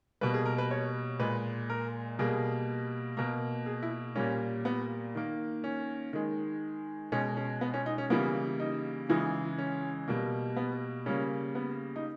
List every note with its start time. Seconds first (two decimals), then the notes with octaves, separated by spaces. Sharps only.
0.21 B2 G3 A#3 B4
0.34 G#4
0.46 A#4
0.58 B4
0.71 C#5
1.20 A#2 G#3 B4
1.70 A#4
2.19 B2 G3 A#3 G#4
3.17 B2 A#3 A#4
3.66 G#4
3.83 E4
4.15 A#2 G3 A#3 C#4
4.65 B3
5.15 D#3 A#3
5.64 C#4
6.13 D#3 G#3
7.12 B2 G#3 C#4
7.37 C#4
7.61 B3
7.74 C#4
7.86 D#4
7.98 C#4
8.10 C#3 E3 G3 A#3 B3
8.60 D#4
9.09 C#3 E3 G#3 D#4
9.58 C#4
10.08 B2 G3 A#3
10.57 B3
11.06 C#3 G3 A#3 C#4
11.55 B3
11.96 D#4